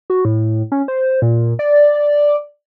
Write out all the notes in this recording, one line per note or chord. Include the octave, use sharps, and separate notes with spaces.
F#4
A2
C#4
C5
A#2
D5